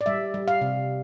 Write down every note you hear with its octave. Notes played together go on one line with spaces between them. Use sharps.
D5
G3 E5
G3
F5
C3